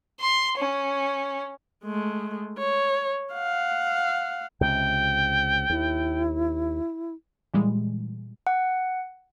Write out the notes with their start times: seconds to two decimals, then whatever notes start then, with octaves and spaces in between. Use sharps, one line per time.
0.20 C6
0.57 C#4
1.84 G#3 A3
2.58 C#5
3.34 F5 F#5
4.61 C#2 C3 G5
5.70 D#2 E4
7.54 A#2 E3 G3 G#3
8.47 F#5